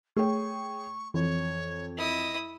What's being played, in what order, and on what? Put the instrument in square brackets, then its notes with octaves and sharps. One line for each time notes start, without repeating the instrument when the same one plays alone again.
[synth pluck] A3 [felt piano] G#4 C#5 G5 [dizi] C#6
[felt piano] F2 [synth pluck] E3 [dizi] C#5
[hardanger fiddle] E4 D#6 [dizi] D#5